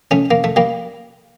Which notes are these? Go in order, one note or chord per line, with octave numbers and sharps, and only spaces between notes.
A3 C#4
A#3
A3
G3 A#3